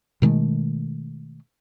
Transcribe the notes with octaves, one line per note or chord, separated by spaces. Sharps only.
B2 D#3 G#3 A3